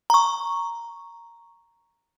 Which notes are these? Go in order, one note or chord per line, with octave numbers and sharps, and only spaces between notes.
A#5 C#6